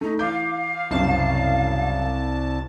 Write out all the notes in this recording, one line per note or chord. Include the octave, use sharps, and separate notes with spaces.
A3 D#4
E3 F5 D6 G6
C2 F#2 C#3 A5